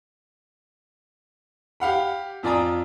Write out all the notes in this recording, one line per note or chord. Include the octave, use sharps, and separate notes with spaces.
G4 F5 F#5 B5
F2 F4 D5 G#5 A#5 D#6